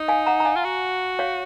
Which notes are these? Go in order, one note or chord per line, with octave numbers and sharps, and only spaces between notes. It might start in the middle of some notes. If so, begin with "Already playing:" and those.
Already playing: D#4
F5 G#5
F#5 A#5
A#5
F5 G#5
F4
F#4
C#5 F5